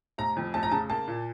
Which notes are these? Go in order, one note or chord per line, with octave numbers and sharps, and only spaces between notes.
F1 A#5
F2
F1 A5
A#5
C#3 A5
A#3 A5
A#2